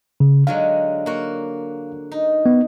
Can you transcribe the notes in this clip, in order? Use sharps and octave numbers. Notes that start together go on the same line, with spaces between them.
C#3
D3 F#3 G#3 F5
A#3 F#4
D#4
B3